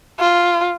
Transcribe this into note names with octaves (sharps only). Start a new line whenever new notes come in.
F4